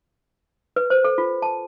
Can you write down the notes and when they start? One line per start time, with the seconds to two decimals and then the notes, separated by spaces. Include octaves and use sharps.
0.76 B4
0.90 C5
1.04 A4
1.18 F4
1.42 A5